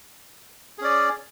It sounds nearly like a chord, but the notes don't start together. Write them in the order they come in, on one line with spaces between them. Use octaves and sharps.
G#4 C#4 D5